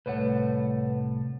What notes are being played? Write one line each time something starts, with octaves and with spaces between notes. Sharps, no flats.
C2 A2 A3 B4 C#5 F#5